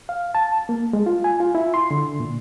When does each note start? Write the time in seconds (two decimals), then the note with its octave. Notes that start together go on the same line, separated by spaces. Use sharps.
0.09 F5
0.35 A5
0.69 A#3
0.93 G#3
1.06 F4
1.24 G#5
1.40 F4
1.55 E4
1.74 C6
1.91 D3
2.20 A#2